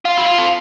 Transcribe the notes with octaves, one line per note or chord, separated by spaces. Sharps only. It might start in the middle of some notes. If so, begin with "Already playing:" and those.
F4
E4
F4
A4